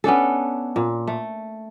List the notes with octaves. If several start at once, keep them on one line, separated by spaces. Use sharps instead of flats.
B3 C#4 D4 A4
A#2
A3